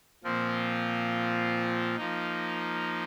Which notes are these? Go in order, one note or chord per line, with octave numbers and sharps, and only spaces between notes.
A#2 F3 C4 F4
F3 A#3 D#4